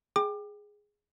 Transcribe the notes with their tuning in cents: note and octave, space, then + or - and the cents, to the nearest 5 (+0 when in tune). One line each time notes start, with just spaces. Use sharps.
G#4 +0 G5 +0 D6 +30